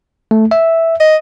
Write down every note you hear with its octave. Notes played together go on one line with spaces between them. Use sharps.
A3
E5
D#5